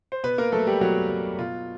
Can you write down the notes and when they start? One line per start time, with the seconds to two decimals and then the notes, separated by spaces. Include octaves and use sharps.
0.12 C5
0.24 B2 B3 B4
0.38 A#3 A#4
0.52 F#3 A3 A4
0.67 G3 G4
0.81 B2 F#3 F#4
1.09 F#3
1.38 B2 F4